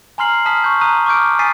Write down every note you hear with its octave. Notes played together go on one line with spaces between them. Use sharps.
G#5 A#5 C6 F6 C7 F#7
A5 D#6 F6 B6
C#6 G6
A#5 D#6 F#6 D#7
C#6 D6 F6 G6 D7
G#5 D#6 A6 B6 C7 D#7